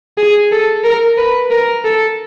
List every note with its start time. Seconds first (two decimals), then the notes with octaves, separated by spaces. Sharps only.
0.18 G#4
0.52 A4
0.84 A#4
1.18 B4
1.51 A#4
1.85 A4